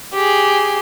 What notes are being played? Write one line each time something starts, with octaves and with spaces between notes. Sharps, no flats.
G4 G#4